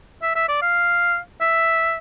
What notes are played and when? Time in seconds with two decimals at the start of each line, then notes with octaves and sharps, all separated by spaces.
0.22 E5
0.35 E5
0.48 D5
0.62 F5
1.41 E5